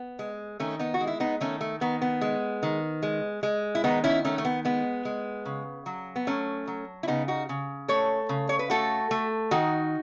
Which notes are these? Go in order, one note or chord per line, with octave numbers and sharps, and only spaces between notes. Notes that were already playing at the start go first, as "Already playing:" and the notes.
Already playing: B3
G#3
D#3 A3 C#4
B3 D#4
F#4
G#3
E4
B3 D#4
D#3 A3 C#4
A3
D#3 B3
B3
G#3
D#3
G#3
G#3
E4
D#3 B3 D#4
C#4 E4
D#3 A3 C#4
A3
B3
G#3 B3
G#3
C#3
F#3
B3
F#3 A3 C#4
F#3
E4
C#3 B3 D#4
D#4 F#4
C#3
A3 A4 C#5
C#3
C#5
B4
A3 F#4 A4
A3
D#3 D#4 F#4